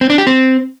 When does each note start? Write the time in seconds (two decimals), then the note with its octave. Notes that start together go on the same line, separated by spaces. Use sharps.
0.01 C4
0.10 D4
0.18 G4
0.27 C4